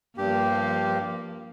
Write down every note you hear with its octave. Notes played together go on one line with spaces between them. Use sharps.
G2 F3 A#3 G4